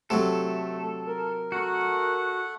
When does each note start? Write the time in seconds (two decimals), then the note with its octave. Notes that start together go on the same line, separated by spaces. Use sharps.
0.10 C3 F#3 A3 A4
1.07 A#4
1.52 A3 F#4 F#5